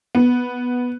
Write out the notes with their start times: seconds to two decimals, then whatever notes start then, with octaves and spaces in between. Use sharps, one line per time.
0.15 B3